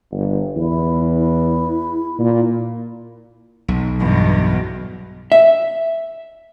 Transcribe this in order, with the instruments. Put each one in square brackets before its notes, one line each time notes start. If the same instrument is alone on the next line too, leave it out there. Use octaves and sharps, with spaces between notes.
[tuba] G1
[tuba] E2 [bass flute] E4
[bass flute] E4
[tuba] A#2
[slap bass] B1
[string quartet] E2 G2 B2
[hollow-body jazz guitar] E5